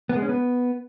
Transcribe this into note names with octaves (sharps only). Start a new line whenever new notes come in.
B3
G#3
C#4
B3